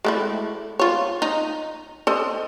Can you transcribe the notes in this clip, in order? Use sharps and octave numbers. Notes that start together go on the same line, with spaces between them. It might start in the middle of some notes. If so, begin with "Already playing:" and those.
G#3 A3 E4
F4 C#5
D#4
A4 C5 D#5